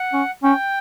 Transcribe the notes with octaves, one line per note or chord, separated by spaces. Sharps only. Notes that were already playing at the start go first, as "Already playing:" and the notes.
Already playing: F#5
C#4
C#4 G5